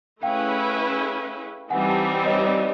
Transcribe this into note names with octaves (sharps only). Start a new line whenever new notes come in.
A3 C#4 E4 G#4 B4 F5 G5
E3 G3 C4 D#4 G4 F#5 G#5
G#5
G5 A5
C#5 D#5
D5